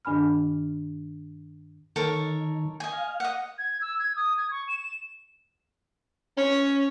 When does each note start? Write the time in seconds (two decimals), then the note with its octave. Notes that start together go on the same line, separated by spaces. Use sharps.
0.05 G2 D#3 D4 G#5 B5 F6
1.96 D#3 A4 A#4 C#5
2.80 D#5 G#5
2.93 F5
3.20 D#5 F#5
3.58 G#6
3.81 E6
3.99 G#6
4.16 D#6
4.38 G#6
4.51 C#6
4.68 E7
6.37 C#4 C#5